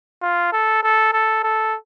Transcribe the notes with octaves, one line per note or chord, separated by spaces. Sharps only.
F4
A4
A4
A4
A4